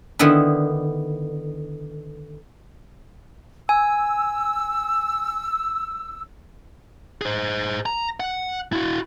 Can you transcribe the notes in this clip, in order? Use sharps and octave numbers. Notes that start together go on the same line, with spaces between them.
D3 D#3 B3 E4 B4
G#5 E6
G#4 C5
A#5
F#5
E4 F#4